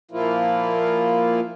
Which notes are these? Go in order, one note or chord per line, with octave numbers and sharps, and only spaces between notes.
A#2 F3 A#3 E4 F4